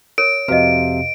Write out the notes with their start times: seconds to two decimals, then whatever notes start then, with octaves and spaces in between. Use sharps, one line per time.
0.18 A#4 C#5 D7
0.48 F2 C3 F#4 B4 D#5 F5